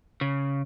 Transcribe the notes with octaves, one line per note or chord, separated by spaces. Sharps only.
C#3